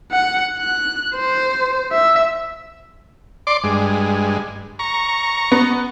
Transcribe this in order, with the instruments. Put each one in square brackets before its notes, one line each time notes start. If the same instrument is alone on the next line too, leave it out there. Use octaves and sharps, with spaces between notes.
[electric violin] F#5
F#6
C5
E5
[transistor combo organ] D5 C6 D6
G2 G#3
A#5 C#6
[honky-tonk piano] B3